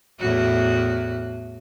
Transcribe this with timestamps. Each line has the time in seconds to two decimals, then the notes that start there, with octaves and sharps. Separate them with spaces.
0.19 E2 A2 F#4